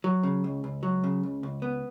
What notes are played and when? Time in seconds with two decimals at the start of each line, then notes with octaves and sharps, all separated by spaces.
0.04 F#3
0.23 C#3
0.44 C#2
0.64 C#2
0.83 F#3
1.04 C#3
1.23 C#2
1.43 C#2
1.62 B3